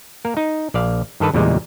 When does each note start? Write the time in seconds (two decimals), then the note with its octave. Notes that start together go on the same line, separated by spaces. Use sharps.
0.25 A#3 A#4
0.37 D#4
0.74 A#1 D5 F5
1.20 G2 D#3 A4 B4 A5
1.34 E2 A#2 C#3 G3 G#3